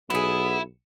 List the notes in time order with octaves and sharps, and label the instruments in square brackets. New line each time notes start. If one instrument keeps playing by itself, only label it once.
[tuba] B1 [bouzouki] B3 G#4 [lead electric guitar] E4